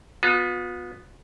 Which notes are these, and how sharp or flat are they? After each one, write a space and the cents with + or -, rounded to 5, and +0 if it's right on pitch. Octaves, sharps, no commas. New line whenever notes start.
B3 +0 F4 +45